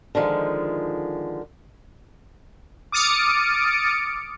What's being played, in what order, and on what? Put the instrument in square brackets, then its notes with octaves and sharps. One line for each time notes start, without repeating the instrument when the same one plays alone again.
[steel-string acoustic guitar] D3 D#3 F3 G#3
[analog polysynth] D6 D#6 F6 A6 C#7 D7